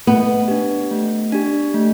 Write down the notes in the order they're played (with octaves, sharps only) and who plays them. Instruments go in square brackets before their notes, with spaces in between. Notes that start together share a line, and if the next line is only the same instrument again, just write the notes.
[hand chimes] A3 [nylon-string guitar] B3
[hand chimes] D4 G4
A3
D4 G4
A3